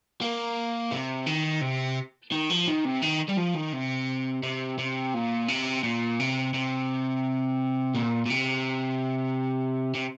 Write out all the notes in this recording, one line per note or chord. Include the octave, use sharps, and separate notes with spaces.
A#3
C3
D#3
C3
D#3
F3
D#3
C3
D#3
G3
F3
D#3
C3
C3
C3
A#2
C3
A#2
C3
C3
A#2
A#2
C3
C3